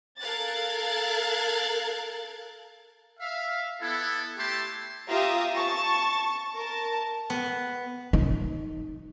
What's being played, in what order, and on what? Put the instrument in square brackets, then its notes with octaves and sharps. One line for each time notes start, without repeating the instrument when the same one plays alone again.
[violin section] A4 A#4 F5 F#6 G#6 A6
[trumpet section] E5 F5
B3 E4 A4
A3 E4 G4 G5 A5 C6
[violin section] F4 G4 E5 F5 A#5 D#6
A5 C#6 A6
A#4 A5
[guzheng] B3
[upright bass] D#4